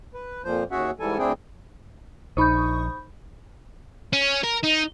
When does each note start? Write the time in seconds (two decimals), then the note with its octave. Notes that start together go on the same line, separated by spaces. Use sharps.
0.14 B4
0.44 F2 A#2 F3 C5
0.71 D#2 C#4 F#4 G#4 E5 F#5
1.00 G#2 E3 G3 A4 G#5
1.18 D2 C4 D4 E4 G#4 G5
2.37 A#1 D#4 C5 B5 C#6 D#6 G6
4.13 C#4
4.44 A#4
4.64 D#4